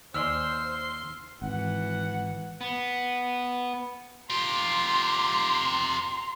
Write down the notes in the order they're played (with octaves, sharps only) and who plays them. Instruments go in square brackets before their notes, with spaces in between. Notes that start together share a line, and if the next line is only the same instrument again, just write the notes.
[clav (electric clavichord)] D#2 D5 G#5 [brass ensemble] C5 [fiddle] C6 [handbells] E6 F6
[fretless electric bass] G#1 [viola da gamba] E3 [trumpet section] F#5
[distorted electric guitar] B3
[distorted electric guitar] F4 G4 [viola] A#5 C6